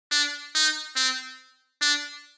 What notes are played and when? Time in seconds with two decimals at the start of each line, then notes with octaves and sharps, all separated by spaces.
0.11 D4
0.55 D#4
0.96 C4
1.81 D4